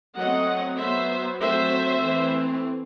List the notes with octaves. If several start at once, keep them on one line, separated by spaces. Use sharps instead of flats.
F#3 A3 C4 D#5 F#5
F#3 B3 C5 E5
F#3 A3 C4 C5 E5
E3 A3 C4